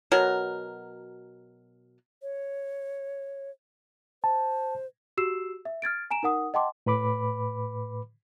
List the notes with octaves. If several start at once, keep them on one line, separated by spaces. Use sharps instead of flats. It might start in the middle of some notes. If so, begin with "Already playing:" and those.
B2 F#3 A#4
C#5
C5 A5
F#4 G4 E6 C7 E7
E5
F6 G#6 A6 D7
G#5 A#5 D7 E7
D#4 A#4 F#5 D#6
D#5 F#5 G5 A5 C6 D6
A2 B4 B5 D6